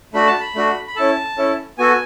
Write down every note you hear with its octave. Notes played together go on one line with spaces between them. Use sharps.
A3 D4 F#4 B5
A5
B5
A3 D4 F#4
B5
C#4 E4 A4 A5
C#4 E4 A4
B3 F#4 A4 G#5